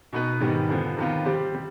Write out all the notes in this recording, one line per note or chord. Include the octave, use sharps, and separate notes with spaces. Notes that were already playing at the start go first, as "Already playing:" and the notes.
B2 B3 D#4 B4
G#2 D#3 G3 B3
F2 D3 F3 B3
C3 D#3 B3 F4
G3 C4 G4 C5
C3 G3